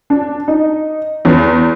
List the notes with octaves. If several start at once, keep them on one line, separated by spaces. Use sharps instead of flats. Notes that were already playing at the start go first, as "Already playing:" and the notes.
D4
D#4
E2